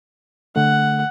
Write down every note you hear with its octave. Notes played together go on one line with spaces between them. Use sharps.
D3 A3 F#5